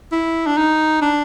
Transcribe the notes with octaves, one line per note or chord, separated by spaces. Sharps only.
E4
D4
D#4
D4